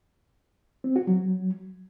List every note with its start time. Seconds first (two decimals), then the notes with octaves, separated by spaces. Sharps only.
0.84 C4
0.96 F#4
1.07 F#3